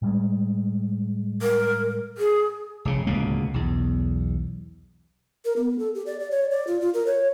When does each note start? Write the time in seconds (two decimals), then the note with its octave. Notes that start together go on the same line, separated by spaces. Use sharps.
0.02 A2 G3 G#3
1.42 A#4
2.18 G#4
2.85 F1 C#3
3.07 D1 C#2 B2 A#3
3.54 B1 E2
5.45 A#4
5.56 B3
5.79 A4
5.95 G4
6.06 D5
6.20 D5
6.31 C#5
6.51 D5
6.67 F4
6.81 F4
6.94 A#4
7.06 C#5